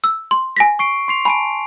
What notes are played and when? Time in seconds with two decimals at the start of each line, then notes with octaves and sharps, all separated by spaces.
0.04 E6
0.31 C6
0.56 G#5 A#6 B6
0.79 C#6 C7 D7
1.08 C6 C7 F7
1.25 G#5 A5 B5 D7